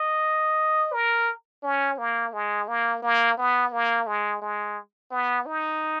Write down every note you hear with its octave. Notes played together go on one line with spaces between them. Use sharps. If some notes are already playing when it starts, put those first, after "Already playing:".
Already playing: D#5
A#4
C#4
A#3
G#3
A#3
A#3
B3
A#3
G#3
G#3
B3
D#4